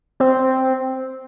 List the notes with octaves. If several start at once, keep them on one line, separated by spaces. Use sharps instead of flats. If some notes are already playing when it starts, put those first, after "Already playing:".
C4